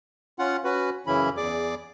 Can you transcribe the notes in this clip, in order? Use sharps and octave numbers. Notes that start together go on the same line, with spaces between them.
C#4 F4 F#5
C#4 F#4 B4
F#2 C#3 E3 C#4 E4 B5
E2 G#4 D5 D6